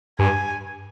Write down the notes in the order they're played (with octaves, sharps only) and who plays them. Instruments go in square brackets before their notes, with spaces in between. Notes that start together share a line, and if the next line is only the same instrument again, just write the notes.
[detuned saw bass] G2 [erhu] G#5